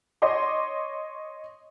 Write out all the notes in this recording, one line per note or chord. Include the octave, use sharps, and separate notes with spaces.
C#5 D#5 C6 D6